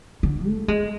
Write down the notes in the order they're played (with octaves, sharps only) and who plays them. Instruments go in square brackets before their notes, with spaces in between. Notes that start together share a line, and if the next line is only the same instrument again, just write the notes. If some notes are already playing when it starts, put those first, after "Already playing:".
[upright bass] D3
A3
G#3